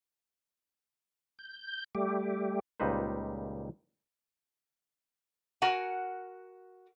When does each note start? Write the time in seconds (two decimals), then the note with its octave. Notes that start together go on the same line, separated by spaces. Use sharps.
1.39 G6
1.95 G3 A3 G4
2.80 C#2 A#2 G3 D#4 B4 C5
5.62 F#4 A#4 F#5 G#5